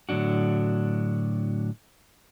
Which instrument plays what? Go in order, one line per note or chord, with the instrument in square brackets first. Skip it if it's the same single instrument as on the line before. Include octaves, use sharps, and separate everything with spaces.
[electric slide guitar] A2 D3 F#3 D4 F#4